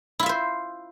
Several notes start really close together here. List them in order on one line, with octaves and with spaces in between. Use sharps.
E4 F4 E5 C5